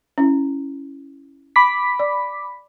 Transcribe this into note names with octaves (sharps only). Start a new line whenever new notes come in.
C#4 E4
B5 D6 B6
D5